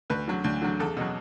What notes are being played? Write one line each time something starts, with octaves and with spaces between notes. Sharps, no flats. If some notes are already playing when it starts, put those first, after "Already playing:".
D2 B4
D3 F#3
D2
D3 F#3
E2 A4
B2 F#3